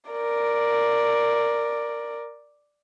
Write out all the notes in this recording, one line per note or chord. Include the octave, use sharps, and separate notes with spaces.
A#4 D5